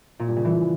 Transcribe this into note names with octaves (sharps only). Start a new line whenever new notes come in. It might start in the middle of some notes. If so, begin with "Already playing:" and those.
A#2
G2
C#3
E3